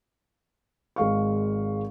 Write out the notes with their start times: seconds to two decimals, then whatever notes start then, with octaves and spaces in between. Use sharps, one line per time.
0.96 G#1 G#3 F5 C#6